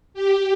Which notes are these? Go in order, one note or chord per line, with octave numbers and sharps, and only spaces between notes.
G4